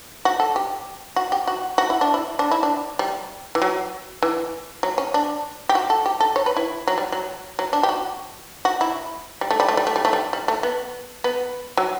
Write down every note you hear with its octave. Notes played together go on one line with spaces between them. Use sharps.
F#4
A4
G4
F#4
G4
F#4
F#4
E4
D4
E4
D4
E4
D4
G3
E3
F#3
E3
F#3
C#4
D4
G4
F#4
A4
G4
A4
C#5
B4
E4
F#3
G3
F#3
F#3
D4
G4
F#4
F#4
E4
G3
A3
G3
A3
G3
A3
G3
A3
G3
G3
A3
B3
B3
F#3